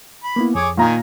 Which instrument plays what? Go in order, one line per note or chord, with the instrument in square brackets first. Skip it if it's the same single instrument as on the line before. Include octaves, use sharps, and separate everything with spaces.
[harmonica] B5
[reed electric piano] A#3 B3 E4
[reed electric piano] F2 [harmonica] G#4 C#5 D6
[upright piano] A#2 A#5 [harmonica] D#3 G#5